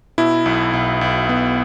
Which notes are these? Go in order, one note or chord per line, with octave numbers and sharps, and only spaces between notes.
B2 E4
B1
B1
B1
B3